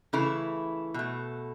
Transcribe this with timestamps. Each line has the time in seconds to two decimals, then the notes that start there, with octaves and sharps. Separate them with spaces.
0.13 C#3 E3 A3 E4
0.94 B2 A3